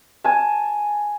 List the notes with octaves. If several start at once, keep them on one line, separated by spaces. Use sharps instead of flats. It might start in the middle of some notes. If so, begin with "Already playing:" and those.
G#5 A5